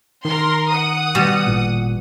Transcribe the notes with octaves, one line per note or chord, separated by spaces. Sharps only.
D#3 A#4 C6
F#5 D#6
B2 G3
G#1 A#2